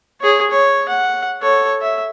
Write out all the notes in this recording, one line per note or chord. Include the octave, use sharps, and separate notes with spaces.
G#4 C#5
C#5
F#5
A4 C#5
E5